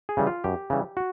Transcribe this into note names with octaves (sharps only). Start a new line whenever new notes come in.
G#4
C#3 E3 G3
F4
F#2 G4
C#3 E3 G3
F#4